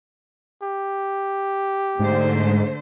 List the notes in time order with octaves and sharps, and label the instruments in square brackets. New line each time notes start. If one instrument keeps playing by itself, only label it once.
[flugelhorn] G4
[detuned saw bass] G#2 [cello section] D3 A3 C5